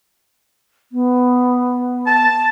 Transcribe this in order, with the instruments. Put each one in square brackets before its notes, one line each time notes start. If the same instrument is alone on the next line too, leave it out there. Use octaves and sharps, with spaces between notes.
[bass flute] B3
[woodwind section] A5